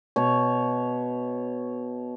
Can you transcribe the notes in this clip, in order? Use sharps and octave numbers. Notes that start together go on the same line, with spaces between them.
B2 C#5